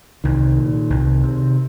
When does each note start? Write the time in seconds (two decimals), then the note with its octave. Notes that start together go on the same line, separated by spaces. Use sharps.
0.24 C2 D#3
0.58 A#2
0.90 C2
1.23 C3